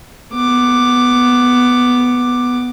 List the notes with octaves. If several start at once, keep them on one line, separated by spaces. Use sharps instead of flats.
B3 D6